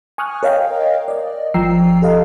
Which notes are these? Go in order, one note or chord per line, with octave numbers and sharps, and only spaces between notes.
G#5 C#6 D#6 F6 F#6
A#4 C#5 D#5 F5 G5
D5 D#5
G1 F3 G5 A#5 E6 C7
G4 A4 D#5 F5